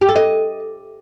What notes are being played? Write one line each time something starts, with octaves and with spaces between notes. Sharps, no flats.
G4
A4
D#5